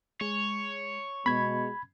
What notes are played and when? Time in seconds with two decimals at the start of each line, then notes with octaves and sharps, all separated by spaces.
0.21 G#3 C#5
1.26 B2 G#3 B3 B5 G#6